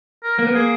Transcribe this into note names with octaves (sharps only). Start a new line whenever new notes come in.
A#4
A#3 A#4
B3
A#3 G#4